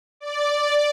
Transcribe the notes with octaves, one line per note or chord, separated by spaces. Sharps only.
D5